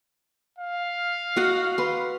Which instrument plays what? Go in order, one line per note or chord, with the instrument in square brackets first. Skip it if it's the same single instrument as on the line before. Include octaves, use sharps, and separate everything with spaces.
[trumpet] F5
[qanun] F#4 D#5 F#5
B4 C6